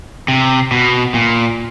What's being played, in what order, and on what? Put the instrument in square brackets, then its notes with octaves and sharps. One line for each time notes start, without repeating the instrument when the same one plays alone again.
[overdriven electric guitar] C3
B2
A#2